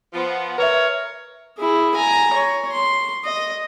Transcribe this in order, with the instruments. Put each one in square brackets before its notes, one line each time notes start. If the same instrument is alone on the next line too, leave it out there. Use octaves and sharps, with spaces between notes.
[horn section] F3 B3
[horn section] A#4 C#5 [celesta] B4 E5
[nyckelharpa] E4 G#4
G#5 A#5
C#5
C6
D#5